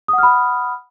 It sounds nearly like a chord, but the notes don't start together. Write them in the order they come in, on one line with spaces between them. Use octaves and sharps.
D#6 F#5 F6 B5